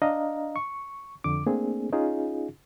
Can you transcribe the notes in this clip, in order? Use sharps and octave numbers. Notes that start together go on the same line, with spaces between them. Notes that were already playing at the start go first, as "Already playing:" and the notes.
D4 D#5 F5 A#5
C#6
F2 D3 D6
A3 A#3 C4 D4 G#4
C#4 D#4 F4 G#4